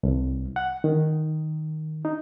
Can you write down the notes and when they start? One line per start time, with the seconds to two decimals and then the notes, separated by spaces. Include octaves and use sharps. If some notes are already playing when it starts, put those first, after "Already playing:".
0.03 C2
0.56 F#5
0.84 D#3
2.05 D#4